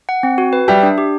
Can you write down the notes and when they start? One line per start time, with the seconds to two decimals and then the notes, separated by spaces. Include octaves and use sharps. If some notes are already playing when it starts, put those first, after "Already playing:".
0.09 F#5
0.23 C4
0.38 F#4
0.53 B4
0.68 G3 G4 E5
0.83 D4
0.98 G4